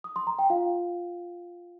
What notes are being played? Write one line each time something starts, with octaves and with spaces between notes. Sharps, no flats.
D#6
C6
A#5
G5
F4 F5